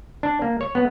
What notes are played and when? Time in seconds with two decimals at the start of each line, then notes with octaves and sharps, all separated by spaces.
0.23 D4
0.42 A#3
0.61 C#5
0.75 B3